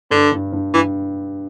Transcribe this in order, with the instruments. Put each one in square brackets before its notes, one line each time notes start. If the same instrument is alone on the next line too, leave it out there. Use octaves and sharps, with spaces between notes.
[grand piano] G2 [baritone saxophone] D3
[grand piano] G2
G2
[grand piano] G2 [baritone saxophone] E3